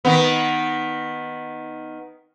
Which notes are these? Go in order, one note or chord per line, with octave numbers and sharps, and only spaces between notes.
D#3 B3